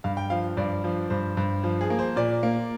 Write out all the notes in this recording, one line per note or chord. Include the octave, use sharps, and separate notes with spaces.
G2 F5
G5
F3 F5
G2 D5
F3
G2 C5
G2
F3
G#4
A#3
C5
A#2 D5
A#3